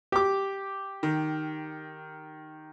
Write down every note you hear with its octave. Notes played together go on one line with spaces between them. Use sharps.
G4 D6
D#3